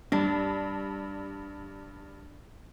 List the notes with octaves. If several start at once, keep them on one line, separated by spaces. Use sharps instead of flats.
G2 D4